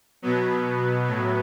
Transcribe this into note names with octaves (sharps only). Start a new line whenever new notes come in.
B2 F#3 B3
A2 F#3